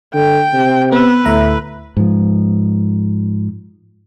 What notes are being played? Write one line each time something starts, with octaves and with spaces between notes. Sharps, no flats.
D3 G5
C3
B3 B4 E6
D2 A2 E5 A#5
G#2 F3